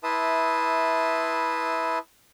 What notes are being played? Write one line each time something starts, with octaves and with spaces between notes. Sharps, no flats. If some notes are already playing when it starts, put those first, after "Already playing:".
E4 B4 E5 A5 C6 D#6